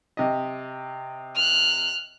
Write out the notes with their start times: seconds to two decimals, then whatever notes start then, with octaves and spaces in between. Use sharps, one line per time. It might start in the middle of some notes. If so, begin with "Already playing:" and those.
0.17 C3 D#5
1.35 F6 F#6